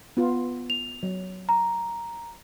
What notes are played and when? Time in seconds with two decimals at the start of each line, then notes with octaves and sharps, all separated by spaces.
0.17 B3 F4
0.70 F7
1.03 F#3
1.49 A#5